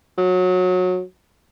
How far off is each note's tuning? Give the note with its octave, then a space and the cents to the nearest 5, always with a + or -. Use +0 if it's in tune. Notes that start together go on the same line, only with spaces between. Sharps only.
F#3 -20